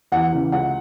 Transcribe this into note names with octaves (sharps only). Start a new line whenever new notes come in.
E2 F#5
C#3 E3
C#2 F#5